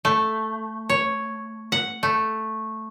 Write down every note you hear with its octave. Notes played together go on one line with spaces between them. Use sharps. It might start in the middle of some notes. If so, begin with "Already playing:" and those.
A3
C#5
F#5
A3